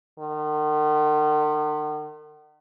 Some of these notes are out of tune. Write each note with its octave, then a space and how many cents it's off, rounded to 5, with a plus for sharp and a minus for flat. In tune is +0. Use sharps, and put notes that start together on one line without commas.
D#3 -45